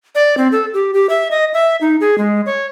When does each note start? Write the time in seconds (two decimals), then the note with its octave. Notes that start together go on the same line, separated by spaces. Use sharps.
0.15 D5
0.38 C4
0.52 A4
0.74 G4
0.94 G4
1.09 E5
1.31 D#5
1.54 E5
1.81 D#4
2.01 G#4
2.18 G#3
2.46 C#5